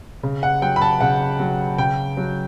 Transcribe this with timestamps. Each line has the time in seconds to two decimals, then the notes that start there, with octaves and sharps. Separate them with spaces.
0.23 C#3
0.43 F#5
0.62 F#3 G5
0.76 B5
0.81 A5
1.01 C#3 F#5
1.40 F#3
1.78 C#3 G5
2.17 F#3